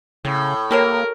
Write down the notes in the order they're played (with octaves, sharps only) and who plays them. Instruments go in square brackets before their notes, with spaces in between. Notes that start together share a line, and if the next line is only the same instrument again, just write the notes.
[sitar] A2 [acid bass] C#3
[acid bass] A#3 [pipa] G4 A4 C#5 [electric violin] A#4